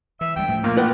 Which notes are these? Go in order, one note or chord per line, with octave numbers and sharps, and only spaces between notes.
E3 E5
D2 G3 G5
A2 F3
A#2 A#3
B3 B4 F#5 G5